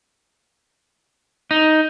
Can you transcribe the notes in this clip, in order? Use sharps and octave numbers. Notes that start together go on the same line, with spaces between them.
D#4